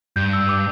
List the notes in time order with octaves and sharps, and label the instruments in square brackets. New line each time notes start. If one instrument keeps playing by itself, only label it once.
[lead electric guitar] G2 [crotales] G6
[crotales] E6
D6